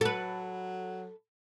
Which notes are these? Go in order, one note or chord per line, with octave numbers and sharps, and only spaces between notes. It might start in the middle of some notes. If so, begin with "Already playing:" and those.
F#3 A4 B4